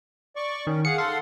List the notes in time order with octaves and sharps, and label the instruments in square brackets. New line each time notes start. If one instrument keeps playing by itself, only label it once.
[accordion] D5 C#6
[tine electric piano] D#3 [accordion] C#4
[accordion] G#4 F5 F#5 [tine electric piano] C#7
[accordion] A4 F#5 C6 [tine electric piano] F5